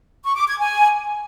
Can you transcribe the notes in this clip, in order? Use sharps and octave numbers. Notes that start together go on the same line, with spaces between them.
C#6
D6
G#6
G#5